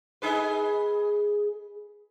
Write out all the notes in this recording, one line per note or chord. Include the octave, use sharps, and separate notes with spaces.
D#4 G#4 B4